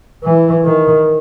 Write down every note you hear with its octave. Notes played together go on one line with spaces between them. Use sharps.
E3
D#3